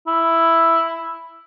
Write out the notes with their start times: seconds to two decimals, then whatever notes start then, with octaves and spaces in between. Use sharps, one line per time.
0.07 E4